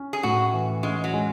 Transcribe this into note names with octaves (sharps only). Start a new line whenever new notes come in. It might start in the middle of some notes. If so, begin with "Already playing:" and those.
Already playing: C#4
G#4
A2 F#4
E3
G#3 C#4
F#3
G#3